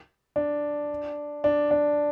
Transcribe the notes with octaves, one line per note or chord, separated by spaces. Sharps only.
D4
D4
D4